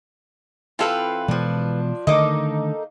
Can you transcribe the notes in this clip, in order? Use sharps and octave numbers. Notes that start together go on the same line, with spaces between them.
E3 C4 F4 A4 B4 F5
B2 E3 F3 G#3 D4
D3 D#3 A3 A#3 D#4 A4 D#5 D6